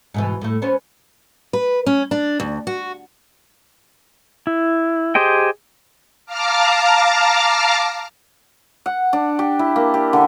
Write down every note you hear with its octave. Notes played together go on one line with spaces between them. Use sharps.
G#2 B2 E3
A2 A3
B3 C#4 C5
B4
C#4
D4
D2
F#4
E4
G4 G#4 C5 D#5 G5
F5 A5 A#5 D6 F6
F#5
D4
G4
E4
A#3
G4
D3